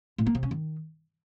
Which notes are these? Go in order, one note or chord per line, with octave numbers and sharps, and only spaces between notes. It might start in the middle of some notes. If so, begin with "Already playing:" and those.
A2
A#3
C3
C#4
D#3